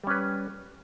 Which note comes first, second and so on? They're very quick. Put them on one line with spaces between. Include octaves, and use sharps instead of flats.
G3 C#4 B4